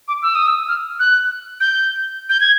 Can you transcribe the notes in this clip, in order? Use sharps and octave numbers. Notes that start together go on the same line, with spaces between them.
D6
E6
D#6
E6
F6
F#6
G6
G6
G#6